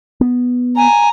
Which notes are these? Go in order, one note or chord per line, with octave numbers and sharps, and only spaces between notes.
B3
G#5 A#5